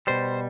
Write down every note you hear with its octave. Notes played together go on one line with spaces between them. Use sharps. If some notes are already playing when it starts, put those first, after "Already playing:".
B2 G3 C5